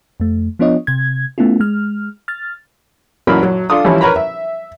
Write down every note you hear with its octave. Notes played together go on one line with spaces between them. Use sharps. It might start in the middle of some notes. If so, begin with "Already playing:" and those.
F2 A3
F3 B3 D4 F4 C#5 D#5
C3 G#6
A3 B3 C#4 E4 F4
G#3 F6
F6 A6
A1 F#2 A#2 F#3 A#4 B5
F#3
D4 F4 A4 C6 D#6
E3 F3 G3 C#4 E4
A#4 B4 C#5 A#5 B5
E5